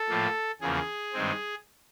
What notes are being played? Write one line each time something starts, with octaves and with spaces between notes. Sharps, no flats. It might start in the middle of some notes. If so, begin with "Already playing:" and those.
Already playing: A4
A2 F3 A#3
E2 C#3 F3 A#3 G#4
G2 D#3 G#3 C4